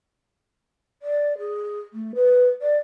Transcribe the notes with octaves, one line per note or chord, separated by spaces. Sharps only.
D5
G#4
A3
B4
D5